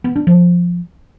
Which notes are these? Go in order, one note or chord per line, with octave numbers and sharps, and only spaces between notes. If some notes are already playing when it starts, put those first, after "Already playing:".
B3
D4
F3